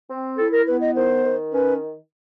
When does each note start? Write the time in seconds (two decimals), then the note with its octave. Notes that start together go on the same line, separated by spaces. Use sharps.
0.09 C4
0.38 E4 A4
0.52 A#4
0.66 B3 B4
0.81 D#5
0.95 D#3 C5
1.23 D#3
1.52 C#4 B4